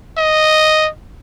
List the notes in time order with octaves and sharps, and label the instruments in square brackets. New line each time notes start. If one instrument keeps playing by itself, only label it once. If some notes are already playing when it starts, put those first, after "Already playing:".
[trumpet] D#5